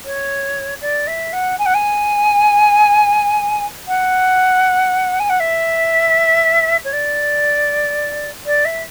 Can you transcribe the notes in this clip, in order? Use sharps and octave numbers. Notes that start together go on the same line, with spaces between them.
C#5
D5
E5
F#5
G#5
F#5
G#5
F#5
G#5
F#5
E5
C#5
D5
D5
E5